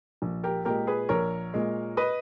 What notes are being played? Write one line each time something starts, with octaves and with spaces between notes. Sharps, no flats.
A#1
G4 A#4
A#2 G#3 G4 A#4
G#4 B4
A#1 A#4 C#5
A#2 G#3
B4 D#5